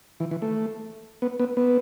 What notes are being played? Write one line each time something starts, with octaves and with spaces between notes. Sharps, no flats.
E3
E3
A3
B3
B3
B3